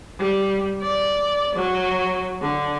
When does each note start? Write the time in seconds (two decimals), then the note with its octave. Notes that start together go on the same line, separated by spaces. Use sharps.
0.19 G3
0.81 D5
1.56 F#3
2.41 D3